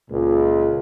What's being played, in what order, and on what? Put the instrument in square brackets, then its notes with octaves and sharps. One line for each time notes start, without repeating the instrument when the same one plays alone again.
[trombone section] C#2 A#2